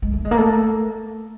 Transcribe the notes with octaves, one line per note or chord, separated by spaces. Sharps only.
G#3
A3
G#3
A#3
A3